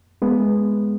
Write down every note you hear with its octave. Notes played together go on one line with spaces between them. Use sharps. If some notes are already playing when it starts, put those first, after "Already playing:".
G#3 B3